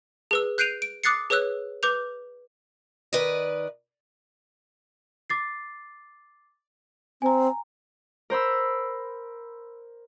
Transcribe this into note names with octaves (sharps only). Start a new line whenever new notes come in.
G#4 B4 E6
F#6 G6 C7 D7 D#7 F7
D7
D6 D#6 F#6 A6 C7 C#7
G#4 B4 C#5 E6 F#6
B4 D6 G6 F7
D#3 B4 D5 D#5
D6 A6 C7
C4 G#5 A#5
A#4 C5 B5 E6